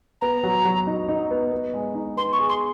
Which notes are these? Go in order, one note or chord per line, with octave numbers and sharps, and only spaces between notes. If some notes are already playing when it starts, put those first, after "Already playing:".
B3 A#5
F#3
F#3
D#4
D#4
B3
B3
G#3
D#4
B3 C6
C#6
G#4
C6